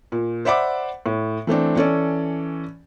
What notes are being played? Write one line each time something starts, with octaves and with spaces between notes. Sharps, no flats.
A#2
C5 D5 E5 F#5 B5 D6
A2
E3 A3 C4 D4
E3 C#4 A4 D5